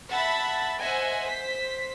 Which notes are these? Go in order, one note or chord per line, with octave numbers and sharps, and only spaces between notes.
E5 F#5 A5 B5 A6 B6
C5 D#5 E5 F#5 G#5
C5 B6